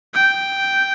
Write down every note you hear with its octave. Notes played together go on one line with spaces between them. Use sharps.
G5